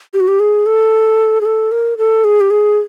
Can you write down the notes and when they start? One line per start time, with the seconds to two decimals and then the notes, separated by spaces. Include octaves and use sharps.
0.14 G4
0.20 F#4
0.28 G4
0.40 G#4
0.66 A4
1.41 G#4
1.45 A4
1.72 A#4
1.98 A4
2.24 G#4
2.41 G4
2.50 G#4